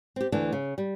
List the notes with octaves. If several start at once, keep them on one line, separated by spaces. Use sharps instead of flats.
C4 G4
D2 E3 D4 A4
C#3
G3